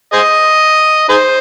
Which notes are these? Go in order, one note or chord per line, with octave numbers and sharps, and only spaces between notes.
G#4 C5 D#5
D#4 G#4 C5